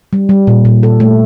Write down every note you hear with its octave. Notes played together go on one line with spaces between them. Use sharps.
G3
G3
A#2
A#2
A4
A3